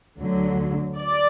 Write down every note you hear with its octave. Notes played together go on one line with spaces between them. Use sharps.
D2 D3 F#3
D5